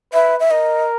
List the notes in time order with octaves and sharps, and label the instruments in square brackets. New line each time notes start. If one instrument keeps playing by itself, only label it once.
[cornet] B4 [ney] E5
[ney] E5
[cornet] A#4 [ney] D#5